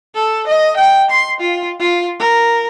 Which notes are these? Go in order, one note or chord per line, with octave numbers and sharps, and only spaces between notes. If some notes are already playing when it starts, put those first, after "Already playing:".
A4
D#5
G5
C6
F4
F4
A#4